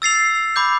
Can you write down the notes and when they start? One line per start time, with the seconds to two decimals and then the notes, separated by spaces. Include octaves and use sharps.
0.02 E6 A6 C7 F7
0.56 B5 D6 G6